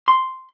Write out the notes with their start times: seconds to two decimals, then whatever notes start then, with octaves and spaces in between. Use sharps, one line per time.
0.08 C6